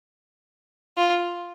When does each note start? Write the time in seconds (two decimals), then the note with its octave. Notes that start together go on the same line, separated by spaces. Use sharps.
0.97 F4